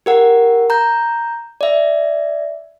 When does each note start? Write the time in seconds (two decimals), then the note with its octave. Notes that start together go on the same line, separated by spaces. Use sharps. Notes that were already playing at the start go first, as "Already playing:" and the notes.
0.06 G4 A#4 F#5
0.70 A#5 G6
1.61 D5 E5